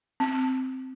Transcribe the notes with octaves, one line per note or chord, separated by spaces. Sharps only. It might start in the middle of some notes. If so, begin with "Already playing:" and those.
C4